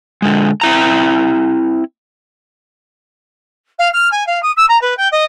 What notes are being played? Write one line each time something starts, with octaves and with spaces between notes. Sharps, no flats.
D3 G#3
C4 E4 A#5
F5
F6
G#5
F5
D#6
E6
A#5
B4
G5
D#5